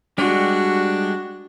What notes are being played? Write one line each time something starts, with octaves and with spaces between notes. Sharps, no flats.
G3 G#3 D4 F#4 G4